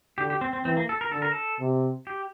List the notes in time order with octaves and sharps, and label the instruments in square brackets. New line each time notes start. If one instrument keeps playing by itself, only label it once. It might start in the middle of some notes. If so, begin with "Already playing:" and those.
[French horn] D3 [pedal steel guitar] G4
[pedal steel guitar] G4
C4
C4
[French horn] E3 [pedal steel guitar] C4
[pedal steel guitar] A#3
A4
A#4
[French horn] D3 [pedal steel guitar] A4
[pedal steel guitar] A#4
A4
[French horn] C3
[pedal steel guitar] G4